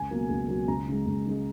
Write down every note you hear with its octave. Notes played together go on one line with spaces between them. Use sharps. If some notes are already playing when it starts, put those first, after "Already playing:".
Already playing: C#2 G#5
B2 F#3 A#3
C#2
B2 F#3 A#3
C#2 A#5
C#3 G#3
C#2
C#3 G#3